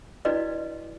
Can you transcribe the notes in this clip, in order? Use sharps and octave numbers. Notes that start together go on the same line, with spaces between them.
D4 E4 F#4 B4 D5 D#5